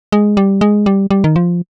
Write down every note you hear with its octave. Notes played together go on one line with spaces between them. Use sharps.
G#3
G3
G#3
G3
G3
D#3
F3